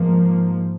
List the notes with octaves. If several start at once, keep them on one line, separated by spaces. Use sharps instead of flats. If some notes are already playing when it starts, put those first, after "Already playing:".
Already playing: G#2 F3 A#3